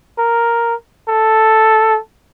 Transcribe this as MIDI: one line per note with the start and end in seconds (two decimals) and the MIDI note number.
0.18 0.75 70
1.09 1.99 69